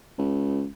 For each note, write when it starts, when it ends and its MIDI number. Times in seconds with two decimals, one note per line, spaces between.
0.18 0.66 37